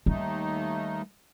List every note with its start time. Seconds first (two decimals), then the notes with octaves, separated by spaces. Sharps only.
0.06 D#2 D#3 G3 A3 D#4